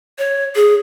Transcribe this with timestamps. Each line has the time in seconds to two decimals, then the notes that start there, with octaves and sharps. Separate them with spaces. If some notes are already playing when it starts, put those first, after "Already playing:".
0.19 C#5
0.56 G#4